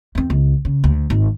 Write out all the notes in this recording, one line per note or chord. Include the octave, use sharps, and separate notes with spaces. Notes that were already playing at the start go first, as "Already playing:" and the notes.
E2 C4
C#2
C#3
D2
G#1